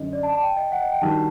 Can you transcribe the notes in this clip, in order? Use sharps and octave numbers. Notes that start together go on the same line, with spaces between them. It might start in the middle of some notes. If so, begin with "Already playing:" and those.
Already playing: F#2 D3 D#5
D5
A5
A5
G5
D#5
F#5
D#5
G5
D#3 G3 D4 F#4 A5